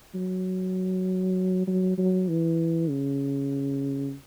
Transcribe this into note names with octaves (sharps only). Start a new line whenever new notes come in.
F#3
F#3
F#3
E3
C#3